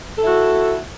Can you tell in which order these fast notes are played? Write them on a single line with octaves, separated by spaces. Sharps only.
A4 E4 F#4